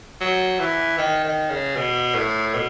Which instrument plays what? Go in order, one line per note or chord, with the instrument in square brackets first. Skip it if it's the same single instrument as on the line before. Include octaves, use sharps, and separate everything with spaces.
[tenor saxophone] F#3
E3
D#3
D#3
C#3
B2
A2
B2